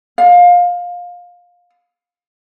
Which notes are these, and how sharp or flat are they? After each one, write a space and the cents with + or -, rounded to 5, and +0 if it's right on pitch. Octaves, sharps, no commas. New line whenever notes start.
F5 +20